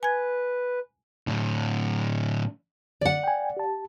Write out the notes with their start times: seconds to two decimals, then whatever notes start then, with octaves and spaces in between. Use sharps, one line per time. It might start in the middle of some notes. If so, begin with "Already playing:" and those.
0.03 B4 G#5 G#6
1.27 A2 D3
3.01 D3 D5 F#5
3.24 G5 G#5
3.57 G4 A5